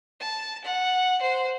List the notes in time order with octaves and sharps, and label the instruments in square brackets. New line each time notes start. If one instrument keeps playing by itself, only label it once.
[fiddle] A5
F#5
C5